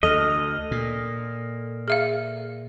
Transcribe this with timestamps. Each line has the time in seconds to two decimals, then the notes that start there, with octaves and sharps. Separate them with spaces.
0.03 D2 A4 D#5 F6
0.71 A#2
1.88 G#4 E5 F5